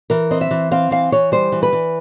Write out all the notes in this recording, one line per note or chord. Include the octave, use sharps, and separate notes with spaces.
E3 A#4
C4 D#5
E5
E3
C4 F5
E3 F5
E3 C#5
G3 C5
E3
B4
E3